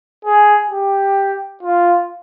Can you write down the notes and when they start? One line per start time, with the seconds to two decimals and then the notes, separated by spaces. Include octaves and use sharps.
0.25 G#4
0.71 G4
1.63 F4